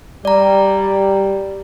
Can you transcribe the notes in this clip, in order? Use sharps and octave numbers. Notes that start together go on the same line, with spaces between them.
G3 D5 A#5